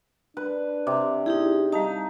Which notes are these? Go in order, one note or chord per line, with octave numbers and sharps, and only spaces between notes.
D4 B4
C3 D6
D#4 E4 G4 G#4
G3 D#4 F5 A5